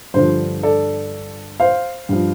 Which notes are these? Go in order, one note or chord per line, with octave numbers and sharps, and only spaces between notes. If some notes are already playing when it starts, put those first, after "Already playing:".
G2 D3 F3 C5
A4 D5
C5 F5
G2 F3